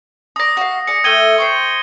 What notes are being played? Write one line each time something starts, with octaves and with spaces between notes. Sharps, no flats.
D5 A#5 D#6 A#6
F#4 F5
G#4 D5 C#7
A3 G5 D#6 G#6 D#7 G7
C5 G5 C#6